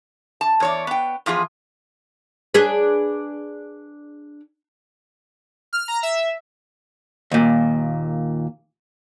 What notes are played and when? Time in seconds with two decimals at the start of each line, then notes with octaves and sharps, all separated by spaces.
0.41 A5
0.60 E2 C#5 D5
0.87 B3 G5
1.26 E2 F3 F4 G#4
2.54 D4 G#4 B4
5.73 F6
5.88 A#5
6.03 E5
7.31 D#2 A#2